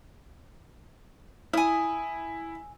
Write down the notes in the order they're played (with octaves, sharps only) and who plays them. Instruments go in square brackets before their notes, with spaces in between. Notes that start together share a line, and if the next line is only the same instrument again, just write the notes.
[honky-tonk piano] E4 [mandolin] G#5 D#6